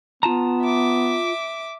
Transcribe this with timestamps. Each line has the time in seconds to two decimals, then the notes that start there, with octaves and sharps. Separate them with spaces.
0.23 B3 F4 A5 A#5
0.63 E5 D6